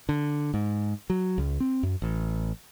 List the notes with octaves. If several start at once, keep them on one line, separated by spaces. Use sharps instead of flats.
D3
G#2
F#3
C#2
C4
F#2
A1